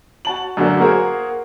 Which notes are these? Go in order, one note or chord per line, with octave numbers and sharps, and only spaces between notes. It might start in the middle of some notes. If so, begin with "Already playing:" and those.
F#4 A5 F#7
F#2 D3 F#3 A#3
A#3 F#4 G#4 A#4 C5